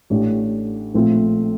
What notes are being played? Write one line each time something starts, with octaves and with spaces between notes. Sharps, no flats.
A1 A2 A3 D4 G4
A#1 A2 A3 C4 F4